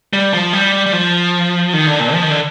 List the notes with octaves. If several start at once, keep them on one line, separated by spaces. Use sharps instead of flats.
G3
F3
G3
G3
F3
D#3
D3
A#2
F3
D#3
D3